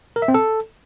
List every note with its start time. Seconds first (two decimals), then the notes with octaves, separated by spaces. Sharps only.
0.16 A#4
0.22 E5
0.28 C4
0.34 A4